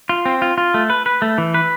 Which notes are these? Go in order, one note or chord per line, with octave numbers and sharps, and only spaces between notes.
F4
C4
F4
F4
A3
B4
B4
A3
E3
B4